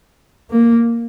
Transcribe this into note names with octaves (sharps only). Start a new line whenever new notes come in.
A#3